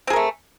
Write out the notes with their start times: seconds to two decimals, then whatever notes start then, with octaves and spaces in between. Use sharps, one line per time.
0.07 C4
0.10 G#4
0.13 A#4
0.16 A3